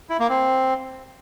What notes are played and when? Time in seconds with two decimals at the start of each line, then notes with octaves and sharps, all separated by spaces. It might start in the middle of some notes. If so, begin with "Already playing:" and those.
0.10 E4
0.20 A#3
0.30 C4